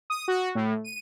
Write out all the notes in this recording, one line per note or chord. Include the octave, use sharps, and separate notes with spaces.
D#6
F#4
A2
D#7